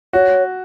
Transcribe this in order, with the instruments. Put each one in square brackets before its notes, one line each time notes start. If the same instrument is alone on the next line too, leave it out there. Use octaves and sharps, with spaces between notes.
[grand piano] F#4 [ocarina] C#5